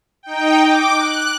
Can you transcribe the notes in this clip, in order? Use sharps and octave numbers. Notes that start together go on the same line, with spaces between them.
D#4 G5
D6
F#6